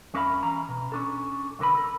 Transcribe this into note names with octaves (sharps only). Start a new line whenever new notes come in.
F2 C#4 A#4 E5 F5 B5
E3 C#4 A#5
B2
C#4 D4 A4
B1 D3 A#4 B4 B5
A4 A#4